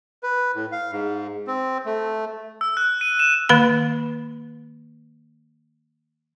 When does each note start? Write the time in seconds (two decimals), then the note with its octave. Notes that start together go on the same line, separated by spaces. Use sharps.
0.23 B4
0.55 A2
0.72 F5
0.92 G#2
1.47 C4
1.86 A3
2.61 E6
2.77 F#6
3.01 D#7
3.19 E7
3.49 D#3 A#3 B4 B5